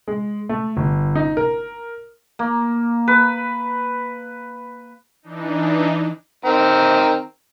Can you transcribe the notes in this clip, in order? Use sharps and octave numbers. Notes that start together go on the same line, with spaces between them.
G#3
A3
G1
D#4
A#4
A#3
B4
E3 D4 D#4
D#3 C4 A#5